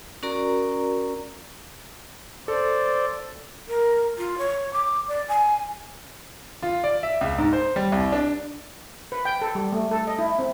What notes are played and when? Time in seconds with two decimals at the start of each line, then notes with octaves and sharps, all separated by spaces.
0.23 C#4 F#4 A#4 D5 A#5
2.48 A4 C5 D5
3.68 A#4
4.18 F4
4.38 C#5
4.73 D6
5.08 D5
5.29 G#5
6.63 F4
6.84 D5
7.03 E5
7.21 C#2
7.38 G#2
7.53 C5
7.76 G3
7.92 C2
8.12 D4
9.12 B4
9.25 G5
9.42 A4
9.55 G3
9.72 A3
9.91 A4
10.07 D#5
10.19 E4
10.39 C4